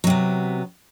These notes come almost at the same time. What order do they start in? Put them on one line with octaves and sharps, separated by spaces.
F#3 C3 B3